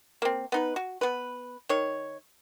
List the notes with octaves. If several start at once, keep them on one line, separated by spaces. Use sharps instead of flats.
A#3 C4
B3 D#4 B4
F#4
B3 B4
D#3 C#5